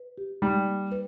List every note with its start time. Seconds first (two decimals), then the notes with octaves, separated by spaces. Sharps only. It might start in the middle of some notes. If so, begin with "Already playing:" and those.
Already playing: B4
0.18 G4
0.42 G3 D#4
0.67 A#3
0.92 B4